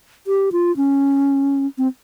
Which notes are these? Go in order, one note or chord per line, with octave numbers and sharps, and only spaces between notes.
G4
F4
C#4
C4